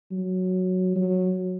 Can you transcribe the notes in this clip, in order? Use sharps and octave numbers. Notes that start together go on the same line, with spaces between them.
F#3
F#3